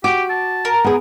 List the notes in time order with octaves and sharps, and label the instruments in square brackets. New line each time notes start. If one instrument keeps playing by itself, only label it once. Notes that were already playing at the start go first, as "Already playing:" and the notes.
[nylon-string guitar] F#4 [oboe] G4 [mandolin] D6
[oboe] A5
[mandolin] A#4
[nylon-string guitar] B3 G#4